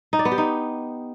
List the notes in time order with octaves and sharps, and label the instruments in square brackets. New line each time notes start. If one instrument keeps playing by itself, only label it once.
[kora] D#4
D5
B3
G4
D#4